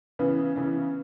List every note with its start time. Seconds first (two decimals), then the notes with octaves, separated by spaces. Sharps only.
0.19 C#3 E3 B3
0.56 C#3 E3 B3